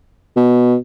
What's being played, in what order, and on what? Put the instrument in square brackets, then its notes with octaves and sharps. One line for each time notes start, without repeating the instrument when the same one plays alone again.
[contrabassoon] B2